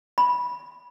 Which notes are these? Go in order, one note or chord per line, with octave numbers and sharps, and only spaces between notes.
B5